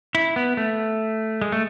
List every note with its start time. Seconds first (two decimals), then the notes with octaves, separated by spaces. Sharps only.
0.15 E4
0.36 B3
0.57 A3
1.42 G#3
1.52 A3